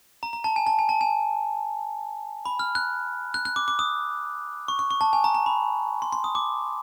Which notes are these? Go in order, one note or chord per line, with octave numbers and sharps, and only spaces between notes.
A#5
A#5
A5
G#5
A5
G#5
A5
G#5
B5
F6
F#6
F#6
F#6
D6
D6
D#6
C#6
C#6
C#6
A5
G#5
A#5
A#5
B5
C6
C6
D#6
D6